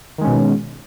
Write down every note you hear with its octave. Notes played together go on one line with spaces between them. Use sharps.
B2 D#3 G#3 C#4